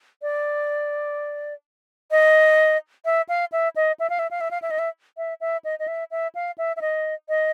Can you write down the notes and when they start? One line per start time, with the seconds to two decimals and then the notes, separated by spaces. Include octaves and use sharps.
0.22 D5
2.11 D#5
3.05 E5
3.29 F5
3.52 E5
3.76 D#5
3.99 E5
4.10 F5
4.19 E5
4.31 F5
4.41 E5
4.51 F5
4.62 E5
4.70 D#5
4.79 E5
5.17 E5
5.41 E5
5.64 D#5
5.79 D#5
5.87 E5
6.11 E5
6.35 F5
6.58 E5
6.76 E5
6.81 D#5
7.29 D#5